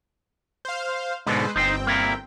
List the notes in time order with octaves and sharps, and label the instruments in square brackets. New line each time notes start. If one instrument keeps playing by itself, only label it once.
[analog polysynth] C5 F5
[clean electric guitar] G#2 B2 D3 [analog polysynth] G#3 B4 C5
[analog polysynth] G1 C4 G5 [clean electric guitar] D#4 C5
[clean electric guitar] A#3 E4 A#4